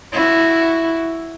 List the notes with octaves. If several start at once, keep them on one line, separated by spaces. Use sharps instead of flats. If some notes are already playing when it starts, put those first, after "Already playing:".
E4 F#4